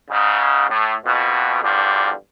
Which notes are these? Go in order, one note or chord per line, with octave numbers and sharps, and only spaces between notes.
G#2 C#3
A2
F2 B2
E2 G2 D3 F3